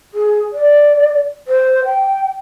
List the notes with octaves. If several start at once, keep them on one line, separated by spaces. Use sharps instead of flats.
G#4
D5
C5
G5